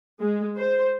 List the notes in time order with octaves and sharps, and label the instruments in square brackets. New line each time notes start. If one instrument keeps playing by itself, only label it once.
[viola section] G#3
C5